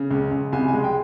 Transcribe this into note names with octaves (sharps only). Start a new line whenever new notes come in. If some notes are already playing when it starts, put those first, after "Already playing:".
Already playing: C#3
C#2
C#2
C2 G#5
G#3 G#5
G5